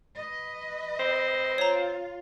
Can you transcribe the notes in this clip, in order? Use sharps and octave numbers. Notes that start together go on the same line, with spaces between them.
B4 D#5
C4
F4 C#5 F5 A#5